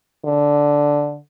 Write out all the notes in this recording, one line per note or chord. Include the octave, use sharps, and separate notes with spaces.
D3